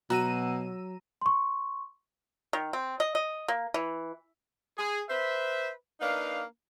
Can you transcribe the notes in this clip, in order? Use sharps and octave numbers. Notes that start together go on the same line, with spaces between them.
B2 F#3 F#4 A#5 E6 D#7
C6 C#6
D#3
C4
D#5
D#5
A#3
E3
G#4
B4 C5 E5
A#3 D4 D#4 B4 F5